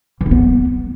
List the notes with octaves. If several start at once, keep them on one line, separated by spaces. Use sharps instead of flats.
E3
C#4
B3